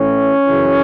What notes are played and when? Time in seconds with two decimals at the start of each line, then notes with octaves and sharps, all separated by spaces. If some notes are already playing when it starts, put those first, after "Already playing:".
Already playing: A2 E3 C#4
0.45 F#2 C#3 E3